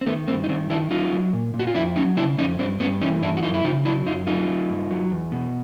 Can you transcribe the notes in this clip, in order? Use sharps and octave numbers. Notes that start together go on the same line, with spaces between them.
C4
D#3 A3 B3
G2 A#3 C4
D#4
D#3 C4 D4
D#3 D4 E4
F#3 D#4 F4
F#3
A#2
A#2
F#4
F4
F2 D4 E4
F#3 C#4 D#4
C#3 D4 E4
F2 C#4 D#4
G2 C4 D4
G2 B3 C#4
E3 C#4 D#4
G2 D4 E4
F#4
F#2 D#4 F4
E4
C#3 D#4 F4
F#3 D4 E4
F#2 D#4 F4
F#3 D#4 F4
F#3
G2
F#3
E2
B2